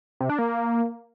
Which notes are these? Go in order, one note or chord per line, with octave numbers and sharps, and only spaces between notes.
C3
D4
A#3